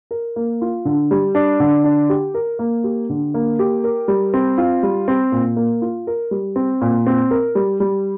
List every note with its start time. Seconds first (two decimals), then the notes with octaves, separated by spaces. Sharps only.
0.11 A#4
0.36 A#3
0.61 F4
0.85 D3
1.11 G3
1.35 D4
1.60 D3
1.84 D4
2.09 G4
2.34 A#4
2.59 A#3
2.84 G4
3.10 D3
3.34 A#3
3.59 G4
3.84 A#4
4.08 G3
4.34 C4
4.58 F4
4.83 G3
5.08 C4
5.32 A#2
5.57 A#3
5.82 F4
6.07 A#4
6.31 G3
6.56 C4
6.81 A#2
7.07 C4
7.31 A#4
7.55 G3
7.80 G3